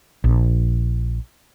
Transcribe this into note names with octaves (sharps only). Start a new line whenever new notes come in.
A#1